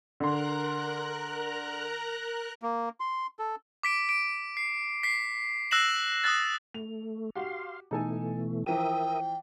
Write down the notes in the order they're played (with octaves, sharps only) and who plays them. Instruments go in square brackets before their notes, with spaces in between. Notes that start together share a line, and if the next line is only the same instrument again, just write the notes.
[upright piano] D3 C6 [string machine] A#4 A#5 F#6
[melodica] A#3
C6
A4
[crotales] D6 B6 D7
D7
C7
B6 C7
E6 F#6 A#6 C7 E7 F#7
D#6 E6 F#6 A6
[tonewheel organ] A3 [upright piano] F7
[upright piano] F#4 G4 [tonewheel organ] F5 C6
[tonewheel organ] B2 E3 A3 [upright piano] D#4 A4 G#5
[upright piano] E3 F3 [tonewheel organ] A#4 E5 D#6 [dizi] G5